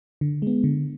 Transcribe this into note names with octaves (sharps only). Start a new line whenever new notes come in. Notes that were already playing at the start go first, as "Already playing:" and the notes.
D3
G#3 B3
D3